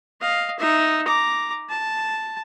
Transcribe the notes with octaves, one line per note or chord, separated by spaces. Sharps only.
D#5 F5
D#4 E5
A#5 D6
A5